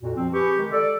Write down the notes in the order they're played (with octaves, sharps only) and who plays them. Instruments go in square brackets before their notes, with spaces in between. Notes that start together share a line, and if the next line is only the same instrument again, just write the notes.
[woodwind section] F2 A#2 F#4
[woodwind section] F3 [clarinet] C4
[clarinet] G4 [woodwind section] G#4 B4 C#6
[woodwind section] D#3 G#3
[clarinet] A4 [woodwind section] D5